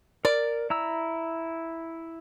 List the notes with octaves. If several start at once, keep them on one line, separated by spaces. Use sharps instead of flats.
A#4 D5
E4 A#5 E6